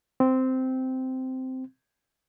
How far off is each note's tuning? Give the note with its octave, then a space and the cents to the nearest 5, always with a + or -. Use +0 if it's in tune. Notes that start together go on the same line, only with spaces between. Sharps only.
C4 -10